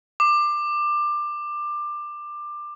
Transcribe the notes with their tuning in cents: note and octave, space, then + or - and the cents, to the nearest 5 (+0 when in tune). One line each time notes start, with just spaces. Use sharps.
D6 +20